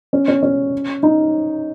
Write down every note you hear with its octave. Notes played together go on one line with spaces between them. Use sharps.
C#4
C#4
C#4
D#4